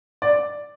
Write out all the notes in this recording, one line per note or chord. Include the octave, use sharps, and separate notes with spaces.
D5